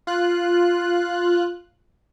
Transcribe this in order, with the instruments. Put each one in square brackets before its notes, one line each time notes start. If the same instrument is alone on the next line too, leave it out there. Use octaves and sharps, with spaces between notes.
[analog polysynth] F4 F#6